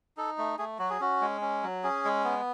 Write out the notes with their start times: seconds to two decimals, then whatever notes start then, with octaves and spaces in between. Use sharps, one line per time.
0.17 D#4 A4
0.38 A3
0.59 A3 G#4
0.79 F#3 F#4
0.90 G#4
1.00 C#4 F#4
1.21 G#3
1.41 C#4
1.63 F#3
1.84 C#4 G#4
2.05 G#3
2.24 B3